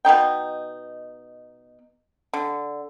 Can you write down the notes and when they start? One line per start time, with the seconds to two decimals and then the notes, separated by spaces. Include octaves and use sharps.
0.05 B2 C4 D#4 G5
2.33 D3